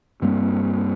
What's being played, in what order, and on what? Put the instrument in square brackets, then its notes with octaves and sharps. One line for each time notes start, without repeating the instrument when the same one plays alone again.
[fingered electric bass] G2 G3 A#3 C4